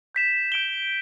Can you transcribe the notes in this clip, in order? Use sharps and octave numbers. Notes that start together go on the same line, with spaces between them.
G6 B6 E7
G6 D7 G7